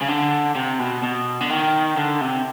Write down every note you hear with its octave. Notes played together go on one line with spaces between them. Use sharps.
C#3
D3
C3
B2
B2
D3
D#3
D3
C3